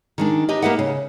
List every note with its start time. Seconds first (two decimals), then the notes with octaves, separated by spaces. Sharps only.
0.18 D#3 G#3 D4
0.49 D#4 G4 B4 D#5
0.63 A#3 G4 B4 D#5 E5 F#5
0.79 C#3